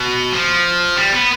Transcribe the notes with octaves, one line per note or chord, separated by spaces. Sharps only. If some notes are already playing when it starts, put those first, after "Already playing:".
Already playing: B2
F3
G3
B3